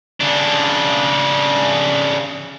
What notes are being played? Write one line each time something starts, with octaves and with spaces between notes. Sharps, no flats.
C#3 D4